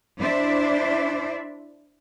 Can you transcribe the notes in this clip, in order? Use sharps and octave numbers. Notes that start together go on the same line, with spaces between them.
D4 E4 C5 D5 E5